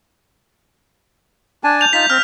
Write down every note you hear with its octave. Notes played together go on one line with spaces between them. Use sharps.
D4 G#5 A5
G6 F7
D#4 F4 B6 F7
C4 F6